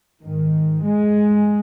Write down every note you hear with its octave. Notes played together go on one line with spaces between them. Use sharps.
G#2 D#3
G#3